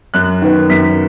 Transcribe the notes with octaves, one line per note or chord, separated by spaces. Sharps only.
F#2 F#6
D#3 B3
F#2 B6